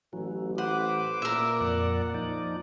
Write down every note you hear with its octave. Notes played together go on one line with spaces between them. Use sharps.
A1 E3 F#3
B4 C5 F#5 D6
A#2 A#4 E5
F2 D5 F#5
F3 D#4 D5